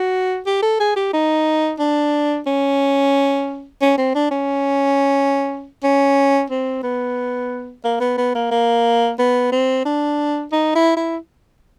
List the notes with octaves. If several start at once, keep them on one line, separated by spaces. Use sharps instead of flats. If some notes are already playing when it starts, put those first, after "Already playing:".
Already playing: F#4
G4
A4
G#4
G4
D#4
D4
C#4
C#4
C4
D4
C#4
C#4
C4
B3
A#3
B3
B3
A#3
A#3
B3
C4
D4
D#4
E4
E4